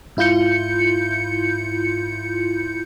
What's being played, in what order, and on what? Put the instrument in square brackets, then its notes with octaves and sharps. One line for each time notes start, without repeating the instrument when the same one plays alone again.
[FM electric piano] G#2 E4 F4 G6 C#7